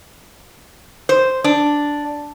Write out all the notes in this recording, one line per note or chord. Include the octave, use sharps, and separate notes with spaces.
C5
D4